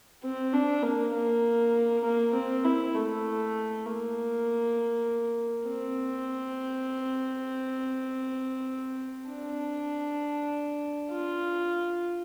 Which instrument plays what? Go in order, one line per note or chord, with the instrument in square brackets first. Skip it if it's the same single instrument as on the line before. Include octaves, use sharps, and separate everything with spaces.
[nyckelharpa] C4
D4
A#3
A#3
A#3
C4
E4
A3
A#3
C4
D4
F4